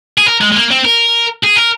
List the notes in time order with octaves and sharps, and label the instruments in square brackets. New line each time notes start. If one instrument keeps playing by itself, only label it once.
[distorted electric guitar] G#4
A#4
G#3
G#3
A#3
C4
A#4
G#4
A#4